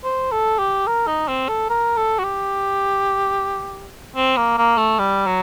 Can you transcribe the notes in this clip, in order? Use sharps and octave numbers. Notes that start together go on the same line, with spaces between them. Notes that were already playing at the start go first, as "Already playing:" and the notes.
C5
A4
G4
A#4
D#4
C4
A4
A#4
A4
F#4
G4
C4
A#3
A#3
A3
G3
F#3